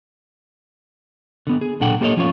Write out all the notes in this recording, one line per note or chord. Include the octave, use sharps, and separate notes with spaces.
D3 B3
G#4
B1 A#2 D4 A4 F#5 G5
A#3 G4 A4 C5 C#5 D#5
F3 C#4 F4 C#5